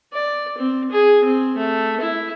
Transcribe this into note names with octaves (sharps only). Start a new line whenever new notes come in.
D5
C4
G#4
C4
A3
E4